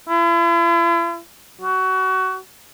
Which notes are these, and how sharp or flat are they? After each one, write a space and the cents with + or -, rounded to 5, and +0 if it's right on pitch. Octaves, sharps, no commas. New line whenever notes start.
E4 +45
F#4 +25